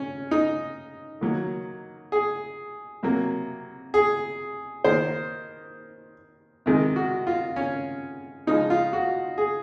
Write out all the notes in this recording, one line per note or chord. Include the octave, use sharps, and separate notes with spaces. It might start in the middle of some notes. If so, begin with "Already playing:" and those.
Already playing: C#4
D#4
D#3 F#3 A#3
G#4
C3 F#3 A#3
G#4
D#3 A#3 C5
C3 D#3 G#3
F#4
F4
C#4
C#3 F3 G#3 D#4
F4
F#4
G#4